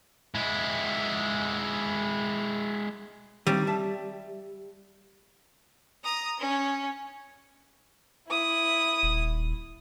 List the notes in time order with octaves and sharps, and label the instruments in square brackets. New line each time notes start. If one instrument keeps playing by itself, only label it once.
[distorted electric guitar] G#3 E4
[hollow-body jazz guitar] D#3 F#3 C4 [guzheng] G3
[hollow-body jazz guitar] E5 A5
[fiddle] A#5 D#6
C#4
[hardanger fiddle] E4 D#6
[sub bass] D#1